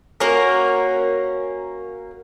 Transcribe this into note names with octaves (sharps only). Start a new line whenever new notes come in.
A#3 C#4 F#4 A#4